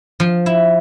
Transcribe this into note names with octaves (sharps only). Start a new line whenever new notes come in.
F3
E4